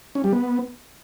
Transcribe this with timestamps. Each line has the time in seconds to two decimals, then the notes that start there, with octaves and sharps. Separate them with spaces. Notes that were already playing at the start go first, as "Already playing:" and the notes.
0.15 C#4
0.24 G3
0.33 B3